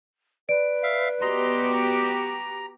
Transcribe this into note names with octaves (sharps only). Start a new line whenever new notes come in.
B4 D5 D7
E5 F5
B3 F#4 G4 D#5 A#5 C6
A#5